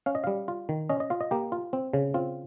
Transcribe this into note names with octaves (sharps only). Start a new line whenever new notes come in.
C#4 F5
D#5
G3 F5
F4
D#3
C#4 D#5
D#5
F4 F5
D#5
A#3 G4
F4
C4
C#3
C4 F4